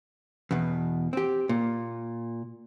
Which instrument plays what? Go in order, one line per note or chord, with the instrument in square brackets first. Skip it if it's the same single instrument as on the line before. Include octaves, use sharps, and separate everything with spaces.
[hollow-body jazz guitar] E2 B2
C4 G4
A#2